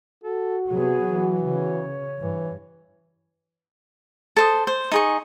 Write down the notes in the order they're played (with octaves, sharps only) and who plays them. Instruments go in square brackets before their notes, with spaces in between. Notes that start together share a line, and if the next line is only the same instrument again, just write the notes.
[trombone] F#4 [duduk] A4
[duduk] C3 [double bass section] F#3 B3 [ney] G#4
[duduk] E3
[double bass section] C#3 [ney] C#5
[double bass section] G2 [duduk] E3
[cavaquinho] A4 C5 D#6
C5
D#4 G#4 C#6